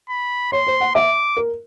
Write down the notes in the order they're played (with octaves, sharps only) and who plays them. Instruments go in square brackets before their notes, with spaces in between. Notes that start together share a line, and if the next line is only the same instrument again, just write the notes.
[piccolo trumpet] B5
[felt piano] C#5 [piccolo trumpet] C6
[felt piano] C5
F#5
[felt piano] E5 [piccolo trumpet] D6
[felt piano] A#4